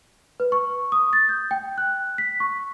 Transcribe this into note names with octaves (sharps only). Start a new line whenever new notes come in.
B4
C#6
D#6
A6
G6
G5
F#6
B6
C#6